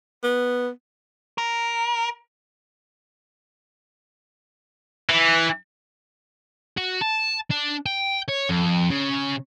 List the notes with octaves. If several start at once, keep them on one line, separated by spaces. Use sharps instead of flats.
B3
A#4
E3
F#4
A5
D4
G5
C#5
F2
C#3